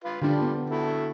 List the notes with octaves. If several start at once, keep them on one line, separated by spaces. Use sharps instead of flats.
F4 B4
D3 F3 G3 D4
B3
E4 F#4 A4